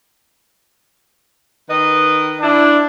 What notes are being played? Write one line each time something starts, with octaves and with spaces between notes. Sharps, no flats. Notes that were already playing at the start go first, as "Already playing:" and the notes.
D#3 B4 D#5
D4 E4